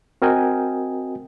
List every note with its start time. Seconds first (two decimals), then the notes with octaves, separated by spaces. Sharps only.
0.22 C4 F#4 A#4 D#5 G5 G#5